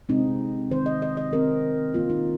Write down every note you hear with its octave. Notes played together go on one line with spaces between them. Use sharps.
C3 G#3 C4 D#4
D#3 C4 C5
D#5
D#5
D#5
D#3 C4 A#4
D#3 A#3 F4
D#4